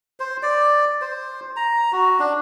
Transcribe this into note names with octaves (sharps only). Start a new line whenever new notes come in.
C5
D5
C5
A#5
F#4
D4